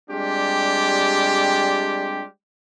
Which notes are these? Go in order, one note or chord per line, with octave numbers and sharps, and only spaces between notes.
G3 G#3 C4 D4 F4 G4